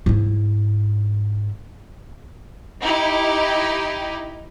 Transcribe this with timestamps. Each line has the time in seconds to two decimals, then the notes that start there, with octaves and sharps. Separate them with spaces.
0.06 G#2 E4
2.79 D#4 E4 G4